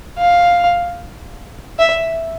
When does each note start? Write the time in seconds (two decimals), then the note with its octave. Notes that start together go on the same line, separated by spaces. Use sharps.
0.18 F5
1.79 E5